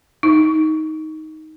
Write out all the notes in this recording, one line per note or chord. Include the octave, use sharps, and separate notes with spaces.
D#4